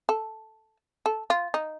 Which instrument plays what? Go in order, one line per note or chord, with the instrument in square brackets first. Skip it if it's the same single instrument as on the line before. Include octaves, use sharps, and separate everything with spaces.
[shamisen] A4
A4
F4
D#4